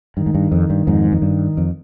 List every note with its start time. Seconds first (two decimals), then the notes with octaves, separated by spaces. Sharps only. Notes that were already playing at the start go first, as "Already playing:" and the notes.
0.17 G2 D#3
0.26 G#2
0.35 G2
0.52 F2
0.70 G2
0.87 F2 G#2
1.12 F2
1.22 G2
1.57 F2